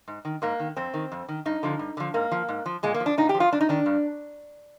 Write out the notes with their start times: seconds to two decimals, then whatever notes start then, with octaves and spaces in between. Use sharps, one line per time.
0.08 G#2
0.25 D#3
0.42 G#2 A#3
0.60 D#3
0.77 F2 C4
0.94 D#3
1.12 F2
1.29 D#3
1.45 G2 D#4
1.63 D3 F3
1.79 G2
1.97 D3 F3
2.14 G#2 A#3
2.32 F3
2.49 G#2
2.66 F3
2.83 A#2 G#3
2.94 A#3
3.00 F3
3.06 D4
3.18 A#2 D#4
3.29 G4
3.35 F3
3.40 F4
3.51 G2 D4
3.61 D#4
3.69 D#3 D4
3.86 G2